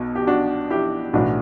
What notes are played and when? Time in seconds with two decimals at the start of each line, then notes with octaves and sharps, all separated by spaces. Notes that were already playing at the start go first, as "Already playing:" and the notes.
Already playing: B1 B2
0.15 G4
0.27 D4 F#4
0.70 E4 G4
1.13 B1 A2 E3 D4 F#4